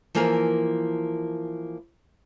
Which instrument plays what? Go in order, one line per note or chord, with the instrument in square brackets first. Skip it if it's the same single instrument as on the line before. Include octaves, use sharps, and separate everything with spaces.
[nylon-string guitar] E3 F3 A#3 G#4 A#4